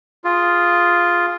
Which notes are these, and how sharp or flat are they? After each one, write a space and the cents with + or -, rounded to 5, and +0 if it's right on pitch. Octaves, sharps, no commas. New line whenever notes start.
F4 +0 G#4 +0